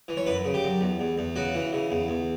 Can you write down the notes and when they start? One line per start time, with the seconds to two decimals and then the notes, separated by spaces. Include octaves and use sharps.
0.08 E3
0.17 C#5
0.26 F#2 B4
0.45 C#3
0.54 G4
0.64 F#2
0.81 E2
0.99 E2
1.18 E2
1.36 C#3 F#4
1.54 E3
1.72 C#3
1.91 E2
2.08 E2